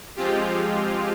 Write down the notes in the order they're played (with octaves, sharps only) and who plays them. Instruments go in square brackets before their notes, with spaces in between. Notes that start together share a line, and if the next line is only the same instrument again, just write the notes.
[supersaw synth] F3 G#3 C4 F4 G4